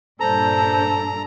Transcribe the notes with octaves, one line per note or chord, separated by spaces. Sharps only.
G2 A#2 D4 A4 C5 A#5